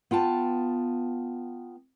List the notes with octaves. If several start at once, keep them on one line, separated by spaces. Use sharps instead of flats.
B3 F4 G5 A5